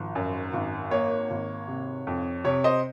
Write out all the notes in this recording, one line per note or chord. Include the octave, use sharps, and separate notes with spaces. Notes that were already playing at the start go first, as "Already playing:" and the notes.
Already playing: G#1 F3
F#2
G#1
A#3 C#5
G#1
C3
F2
C3 C#5
C5 D#5